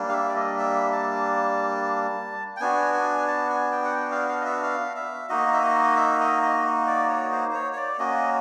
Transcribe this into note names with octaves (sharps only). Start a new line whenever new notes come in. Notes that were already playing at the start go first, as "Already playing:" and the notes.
Already playing: G3 A#3 D4
F5
E5
D5
D#5
E5
A5
G5
B3 D4 F#4 G#5
G#5
A5
G#5
G5
F#5
G5
F5
F5
D#5
E5
F5
E5
A#3 D#4 F#4 D#5
E5
D#5
E5
D#5
D#5
D5
C#5
C5
C5
C#5
C#5
D5
A#3 C#4 F#4 D#5